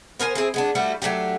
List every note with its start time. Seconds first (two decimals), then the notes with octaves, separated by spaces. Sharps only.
0.19 B3 A#4 C5 G#5
0.35 C4 E4 G#4
0.54 G#3 B3 D4
0.75 G3 A3 E4 F#4
1.02 F#3 A3 D4 G4